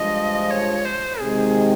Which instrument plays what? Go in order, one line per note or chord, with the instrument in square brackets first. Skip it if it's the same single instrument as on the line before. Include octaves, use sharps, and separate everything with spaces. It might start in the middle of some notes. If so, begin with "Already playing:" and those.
Already playing: [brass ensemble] G2 F3 G#3 [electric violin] D#5
[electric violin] C#5
C5
[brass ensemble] C3 D#3 G#3 [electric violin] G#4